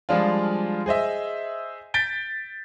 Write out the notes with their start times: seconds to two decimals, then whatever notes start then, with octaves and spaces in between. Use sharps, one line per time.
0.09 F3 G3 G#3 D4 F4
0.86 G#4 C5 D#5 E5
1.94 G6 A6 B6 D7 G7